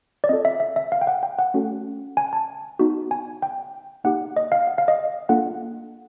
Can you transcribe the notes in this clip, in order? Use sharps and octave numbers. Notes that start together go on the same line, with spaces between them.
D5
C4 F4 A4 D#5
E5
E5
E5
F5
G5
F#5
G5
F#5
A3 C#4 F#4 A4
G#5
A5
B3 D#4 F#4
G#5
G5
A#3 D#4 G4 F#5
D#5
F5
F#5
F5
D#5
A#3 D4 F4 A4 F#5